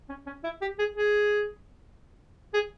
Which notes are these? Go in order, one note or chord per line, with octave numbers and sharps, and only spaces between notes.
C#4
C#4
E4
G4
G#4
G#4
G#4